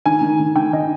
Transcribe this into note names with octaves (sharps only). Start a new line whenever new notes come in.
D#3 G#5
D#3
D#3
D#3 G5
D#3 D#5